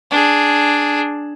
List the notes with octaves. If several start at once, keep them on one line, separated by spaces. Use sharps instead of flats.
D4 G#4